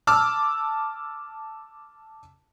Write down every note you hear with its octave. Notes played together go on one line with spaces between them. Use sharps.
A5 D6 E6 F6